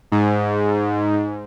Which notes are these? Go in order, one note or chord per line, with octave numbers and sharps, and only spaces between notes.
G#2